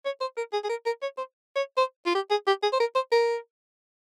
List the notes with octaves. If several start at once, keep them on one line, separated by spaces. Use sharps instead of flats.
C#5
C5
A#4
G#4
G#4
A#4
A#4
C#5
C5
C#5
C5
F4
G4
G#4
G4
G#4
C5
A#4
C5
A#4